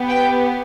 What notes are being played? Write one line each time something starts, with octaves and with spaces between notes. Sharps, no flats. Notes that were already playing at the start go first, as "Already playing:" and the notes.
Already playing: B3 G4
G5